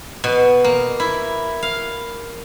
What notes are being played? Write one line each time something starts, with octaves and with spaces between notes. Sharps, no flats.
B2
A#3
E4
F5